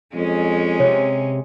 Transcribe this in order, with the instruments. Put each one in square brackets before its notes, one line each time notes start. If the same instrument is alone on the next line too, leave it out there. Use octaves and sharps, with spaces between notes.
[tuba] F2 [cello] G#3 C#4
[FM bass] C3 [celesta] C#5